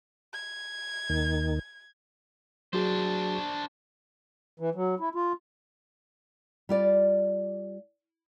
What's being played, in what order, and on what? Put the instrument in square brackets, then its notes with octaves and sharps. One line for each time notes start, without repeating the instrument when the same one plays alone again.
[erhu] G#6
[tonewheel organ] D#2 D#3
[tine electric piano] F#3 F#4 G#4 [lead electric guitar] D4 C5
[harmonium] E3
F#3
E4
F4
[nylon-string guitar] G3 F4 D5